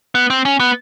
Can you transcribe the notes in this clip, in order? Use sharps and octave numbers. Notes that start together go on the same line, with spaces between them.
B3
C4
C#4
B3